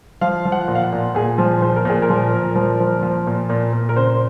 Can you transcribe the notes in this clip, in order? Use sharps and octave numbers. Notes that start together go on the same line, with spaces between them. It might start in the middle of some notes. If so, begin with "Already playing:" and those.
F3 F5
F3
F#5
A#2
F5
F#5
A#2
A#2 G#4
F3
F3 C5
A#4
A#2 G#4
A#4
F3
A#2
F3
F3
F3
A#2
A#2
A#2
A#4
C#3 C5